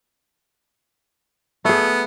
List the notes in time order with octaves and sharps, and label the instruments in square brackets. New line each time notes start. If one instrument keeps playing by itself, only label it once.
[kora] A3 G#4 [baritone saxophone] B3